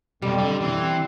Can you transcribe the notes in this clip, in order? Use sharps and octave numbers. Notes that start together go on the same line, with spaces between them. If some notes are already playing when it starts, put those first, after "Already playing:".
B1 F2 G3
D3
E3 C4